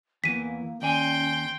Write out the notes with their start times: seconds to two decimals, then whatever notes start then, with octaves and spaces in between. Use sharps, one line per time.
0.24 E2 E3 A#3 B6 D#7
0.82 D#2 C#4 D5 G5 G#5 C6